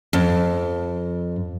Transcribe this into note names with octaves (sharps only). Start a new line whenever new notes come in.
F2